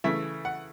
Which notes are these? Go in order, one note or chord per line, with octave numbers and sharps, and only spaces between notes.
C#3 E3 A3 E4 E5
F#5